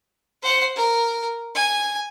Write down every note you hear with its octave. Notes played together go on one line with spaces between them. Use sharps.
C5 F#5
A#4
G#5